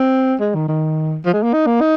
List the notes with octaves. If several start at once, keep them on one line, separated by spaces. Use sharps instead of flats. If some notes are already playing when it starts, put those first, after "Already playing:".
Already playing: C4
G#3
D#3
D#3
F3
G#3
A#3
D#4
A#3
D#4